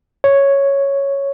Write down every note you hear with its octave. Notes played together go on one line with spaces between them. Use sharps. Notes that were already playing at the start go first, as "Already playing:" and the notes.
C#5